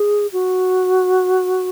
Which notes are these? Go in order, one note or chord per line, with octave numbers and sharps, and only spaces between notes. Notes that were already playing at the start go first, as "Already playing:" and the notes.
Already playing: G#4
F#4